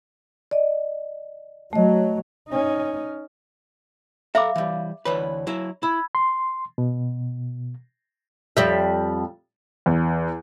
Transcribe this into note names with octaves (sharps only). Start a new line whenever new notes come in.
D5 D#5
F#3 A3 D#5
C#4 D#4
A4 E5 F5 A#5 B5 D6
E3 G3
D2 E3 B4 C#5 B5
F#3 E4
E4 B5 E6 G#6
C6
B2
F2 G3 E5
E2